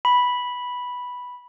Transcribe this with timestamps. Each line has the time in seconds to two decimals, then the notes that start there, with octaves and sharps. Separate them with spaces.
0.05 B5